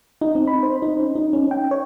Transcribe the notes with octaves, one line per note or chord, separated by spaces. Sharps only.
D#4
C4
B5
C5
D#4
C#4
D#4
C#4
G5
C#5